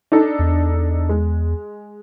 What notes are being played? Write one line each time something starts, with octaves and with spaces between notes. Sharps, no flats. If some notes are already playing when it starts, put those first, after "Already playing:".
D4 D#4 A4
E2
G#3